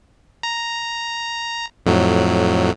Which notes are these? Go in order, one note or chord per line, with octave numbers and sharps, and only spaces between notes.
A#5
F2 A2 F#3